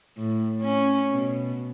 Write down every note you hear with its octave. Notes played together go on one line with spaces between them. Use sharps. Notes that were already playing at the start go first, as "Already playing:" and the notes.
A2
C#4
B2